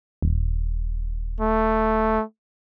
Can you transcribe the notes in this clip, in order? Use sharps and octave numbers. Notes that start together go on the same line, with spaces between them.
D#1
A3